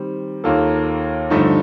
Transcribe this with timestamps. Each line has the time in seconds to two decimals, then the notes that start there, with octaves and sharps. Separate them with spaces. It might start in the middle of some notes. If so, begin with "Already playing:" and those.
Already playing: D#3 G3 C4
0.44 D#2 D#3 A#3 F4 A4
1.30 G2 D3 F3 A3 D#4